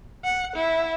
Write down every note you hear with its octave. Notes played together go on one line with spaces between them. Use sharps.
F#5
E4